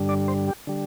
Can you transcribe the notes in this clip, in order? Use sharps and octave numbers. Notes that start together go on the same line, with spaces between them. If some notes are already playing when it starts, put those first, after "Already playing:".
Already playing: G2 D3 G3
D5
C5
G4
D3 G3